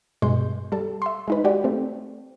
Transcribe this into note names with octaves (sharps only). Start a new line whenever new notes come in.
G2 B2 G#3 C6 G6
G3 A4
E5 C6
G#3 D#4 B4
G#3 F#4 G4 D5
A3 C4